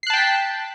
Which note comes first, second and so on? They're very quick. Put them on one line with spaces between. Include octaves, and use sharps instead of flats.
C7 F#6 A5 G5 B6